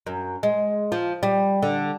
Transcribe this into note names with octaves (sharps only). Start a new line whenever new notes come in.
F#2
G#3
F3
G3
D3